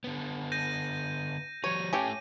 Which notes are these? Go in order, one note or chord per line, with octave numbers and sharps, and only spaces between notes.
D3 B3
G6 A#6 D#7
F3 F#4 G4 C#5 D#7
A3 C#4 G4 A4 C#5